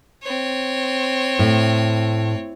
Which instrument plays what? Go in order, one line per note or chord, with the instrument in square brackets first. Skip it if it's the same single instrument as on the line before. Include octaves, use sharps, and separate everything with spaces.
[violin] C4 C#5
[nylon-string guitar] A2